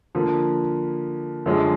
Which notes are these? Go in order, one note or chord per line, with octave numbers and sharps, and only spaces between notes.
D3 F3 A#3
F#2 D3 F3 G#3